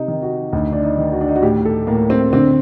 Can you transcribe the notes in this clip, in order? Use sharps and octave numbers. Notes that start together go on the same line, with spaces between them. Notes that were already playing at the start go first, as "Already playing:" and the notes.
Already playing: C3 D#4
D#3
F#4
D2 D#4
D4
D#4
D#3
F#4
D4
D#4
F#4
A2 G4
A4
A2 A#3
C4
D3 C4